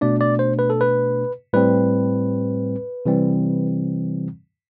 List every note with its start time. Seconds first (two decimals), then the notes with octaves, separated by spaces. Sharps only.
0.01 B2 A3 D4 D5
0.21 D5
0.39 C5
0.59 B4
0.70 A4
0.81 B4
1.53 A2 G3 C4 B4
3.06 C3 E3 G3 C4